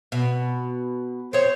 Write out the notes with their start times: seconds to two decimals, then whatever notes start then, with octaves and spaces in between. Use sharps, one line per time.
0.12 B2
1.33 C4 C5 C#5